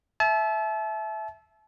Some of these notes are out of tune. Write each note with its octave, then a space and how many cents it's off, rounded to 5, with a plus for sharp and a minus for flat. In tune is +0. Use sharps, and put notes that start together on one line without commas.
E5 +0 A5 -35